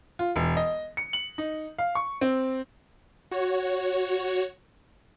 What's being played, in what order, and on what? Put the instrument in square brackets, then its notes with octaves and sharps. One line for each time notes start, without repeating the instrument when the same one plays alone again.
[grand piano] F4
E1
D#5
C#7
F#7
D#4
F5
C#6
C4
[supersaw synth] F#4 C#5